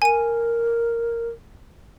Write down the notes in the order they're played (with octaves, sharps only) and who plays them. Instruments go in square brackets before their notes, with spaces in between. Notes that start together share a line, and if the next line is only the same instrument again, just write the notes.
[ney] A#4 [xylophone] G#5 D#7